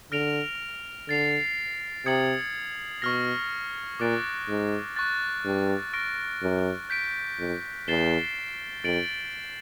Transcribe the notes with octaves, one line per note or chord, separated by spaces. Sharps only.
D3 F6 A#6 D7 F7
D3 A6 C7 F7
C3 D#6 G#6 C#7 F#7
B2 C#6 F6 A#6
A#2 D6 F#6 A6 D7
G#2
C#6 F#6 A6
G2
C#6 F6 A#6 D7
F#2
G6 B6 D7
F2
E2 A6 C7 E7 G7
F2 A6 D7 F#7